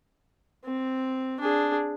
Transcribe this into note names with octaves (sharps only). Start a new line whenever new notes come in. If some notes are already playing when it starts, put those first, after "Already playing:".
C4
D4 G#4